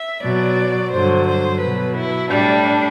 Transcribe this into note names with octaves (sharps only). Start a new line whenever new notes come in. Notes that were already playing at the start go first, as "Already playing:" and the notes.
Already playing: E5
B2 F#3 D5
G2 D3 F#3 C5
C5
B2 F#3 B4
E4
A2 G3 D4